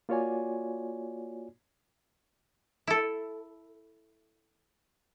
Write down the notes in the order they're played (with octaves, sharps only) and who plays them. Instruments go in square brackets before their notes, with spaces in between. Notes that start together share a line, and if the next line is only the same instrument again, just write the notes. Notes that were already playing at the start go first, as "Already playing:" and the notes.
[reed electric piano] A#3 F4 F#4 C#5 D5 G#5
[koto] E4 A4